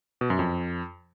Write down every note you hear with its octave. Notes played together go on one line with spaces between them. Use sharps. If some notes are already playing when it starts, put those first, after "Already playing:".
B2
F#2
F2